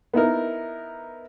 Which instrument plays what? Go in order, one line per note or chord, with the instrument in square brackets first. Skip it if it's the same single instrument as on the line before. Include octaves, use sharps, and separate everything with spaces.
[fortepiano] B3 D#4 E4 A#4